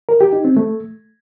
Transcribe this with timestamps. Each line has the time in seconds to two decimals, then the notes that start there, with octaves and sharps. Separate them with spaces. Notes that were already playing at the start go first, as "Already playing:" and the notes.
0.09 A#4
0.21 G4
0.33 D#4
0.45 C4
0.57 A3